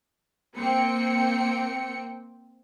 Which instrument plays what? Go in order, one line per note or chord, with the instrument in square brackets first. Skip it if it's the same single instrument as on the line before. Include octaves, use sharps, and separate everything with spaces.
[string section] A#3 C4 G5 C#7